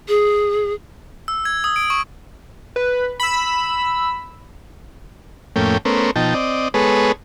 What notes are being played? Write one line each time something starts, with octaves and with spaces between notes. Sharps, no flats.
G#4
E6
G#6
D#6
D7
C#6
B4
B5 E6
F2 A2 A3 A#3 C#4 G5
A3 B3 C#4 A#4 C5
B2 F3 D#4 G5 A5
C4 D5 D#5
G#3 B3 G#4 A4 B4 C#5